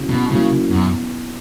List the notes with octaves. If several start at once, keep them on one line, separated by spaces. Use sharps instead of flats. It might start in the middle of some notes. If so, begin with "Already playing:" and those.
Already playing: C#3 F#3 A#3 C#4 E4
B2
C#3 F#3 A#3 C#4 E4
F#2 B2